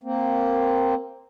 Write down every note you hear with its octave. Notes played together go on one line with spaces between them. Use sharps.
A#3 C4